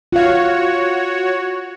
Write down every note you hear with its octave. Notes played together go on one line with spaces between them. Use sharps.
F4 F#4 C#5 F5